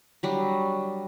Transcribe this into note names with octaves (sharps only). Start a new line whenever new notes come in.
F#3 G3 D4